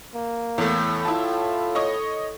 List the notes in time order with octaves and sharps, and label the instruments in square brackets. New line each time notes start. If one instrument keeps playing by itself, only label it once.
[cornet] A#3
[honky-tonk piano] E2 A3 [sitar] A2
[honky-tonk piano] E4 A5 [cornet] F4
[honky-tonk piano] C#5 D#5 C#6